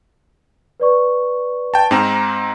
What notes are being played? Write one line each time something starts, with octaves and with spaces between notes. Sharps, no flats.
B4 D5 C#6
G5 A5
G#2 C4 A#5 F6 E7 F7